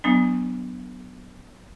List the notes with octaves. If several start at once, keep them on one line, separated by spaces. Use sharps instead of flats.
F#3 B3 D4